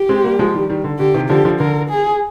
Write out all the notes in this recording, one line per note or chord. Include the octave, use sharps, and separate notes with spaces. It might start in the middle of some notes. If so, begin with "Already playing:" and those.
Already playing: G4
G#3 C4
G3 A#3
F3 G#3
D#3 G3
D#3 G3
D3
D3 G4
C3 D#3
D3 F3 G4
D3 F3
D3 A#4
G#4